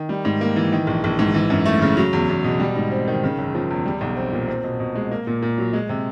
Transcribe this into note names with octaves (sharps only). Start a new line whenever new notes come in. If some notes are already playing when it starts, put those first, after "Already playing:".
Already playing: D#3
G3
G#2
A#3
E3
D#3
A#1
A#1
G#2
E3
F#2
A3
C#3
F#3
E2
E2
B2
G3
G#2
C4
D#3
C#3
F#1
F3
E2
G3
B1
C4
A#2
C4
B2
B2
G#3
A#3
A#2
A#2
F#3
G#3
C3